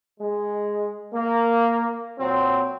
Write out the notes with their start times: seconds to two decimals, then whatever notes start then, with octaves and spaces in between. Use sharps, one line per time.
0.20 G#3
1.14 A#3
2.19 A#2 F#3 C4